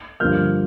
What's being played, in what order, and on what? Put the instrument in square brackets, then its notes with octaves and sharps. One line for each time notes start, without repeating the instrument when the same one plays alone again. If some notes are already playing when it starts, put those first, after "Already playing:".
[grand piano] G2 D3 F3 A#3 F6 G6